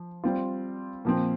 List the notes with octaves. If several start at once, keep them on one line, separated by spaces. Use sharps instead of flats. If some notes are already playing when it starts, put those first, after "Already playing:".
Already playing: F3
G3 C4 F4
A#2 F3 C4